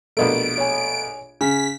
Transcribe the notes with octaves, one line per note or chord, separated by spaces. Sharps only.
A#1 B2 A3 A#4 D7
C#5 G#5
C#3 G#5 B6